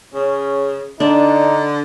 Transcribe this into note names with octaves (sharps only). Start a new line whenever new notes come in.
C#3 C#4
D3 D4 D#4